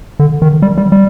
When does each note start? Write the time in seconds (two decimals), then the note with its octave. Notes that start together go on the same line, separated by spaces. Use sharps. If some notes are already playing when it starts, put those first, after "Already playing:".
0.20 D3
0.42 D#3
0.62 G3
0.78 G3
0.92 G3